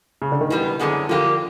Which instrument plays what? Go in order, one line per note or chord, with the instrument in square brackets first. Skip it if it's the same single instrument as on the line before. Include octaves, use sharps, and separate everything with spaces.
[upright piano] C#3
D3
D#3
[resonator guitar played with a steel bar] B2 G3 B3 [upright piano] E3
[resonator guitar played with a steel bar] F#2 D3 F3 G#3 B3
[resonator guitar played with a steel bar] D3 G3 A#3 D#4 G4 [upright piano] F3